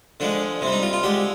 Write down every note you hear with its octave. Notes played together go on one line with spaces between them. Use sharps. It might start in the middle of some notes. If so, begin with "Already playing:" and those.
D3 F3 G#3 D4
C3 C4
G3
D#4
F4
F4
D3 G#3 G4